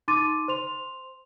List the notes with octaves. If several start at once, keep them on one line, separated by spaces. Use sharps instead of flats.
D#4 C6 D6 A6 D#7
C5 C6 F7